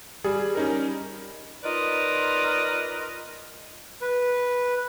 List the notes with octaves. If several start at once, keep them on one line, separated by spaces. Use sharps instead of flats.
G3 G#4
C#4 D#4 A#4
D#4 F4 A#4 B4 D5 D#5
B4